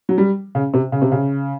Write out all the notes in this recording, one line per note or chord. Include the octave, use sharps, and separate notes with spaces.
F#3
G3
C#3
C3
C#3
C3
C#3